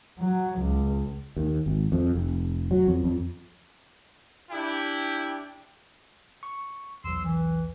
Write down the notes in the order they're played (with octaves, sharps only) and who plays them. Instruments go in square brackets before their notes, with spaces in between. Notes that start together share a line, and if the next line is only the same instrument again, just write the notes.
[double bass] F#3
C#2
[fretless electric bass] D#2
G#1
F2
F1
F#3
F2
F2
[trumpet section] D4 E4 G4 G5
[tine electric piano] C#6
[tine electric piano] B1 E2 [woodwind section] C6 E6
[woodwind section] E3